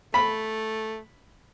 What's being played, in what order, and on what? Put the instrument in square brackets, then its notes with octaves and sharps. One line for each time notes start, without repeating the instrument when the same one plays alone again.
[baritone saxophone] A3 [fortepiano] B5